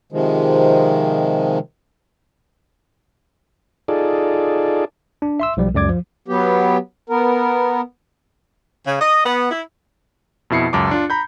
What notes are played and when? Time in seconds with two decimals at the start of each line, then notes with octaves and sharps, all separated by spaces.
0.12 C3 D#3 F3 G#3
3.88 D#4 F4 G#4 A4 D5
5.22 D4
5.40 E5 C6 E6
5.57 B1 F3 G3
5.74 C#2 F#2 D5 D6 G#6
5.89 F3
6.28 F#3 B3 G4
7.10 B3 A#4
8.86 C#3
9.00 D#5
9.25 B3
9.51 E4
10.50 F2 B2 E4 C7 C#7
10.73 C#2 F#2 A5 D6
10.91 D4 F4
11.10 A#5 B5 G6